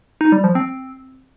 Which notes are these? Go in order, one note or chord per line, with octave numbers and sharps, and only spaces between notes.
D#4
G3
F3
C4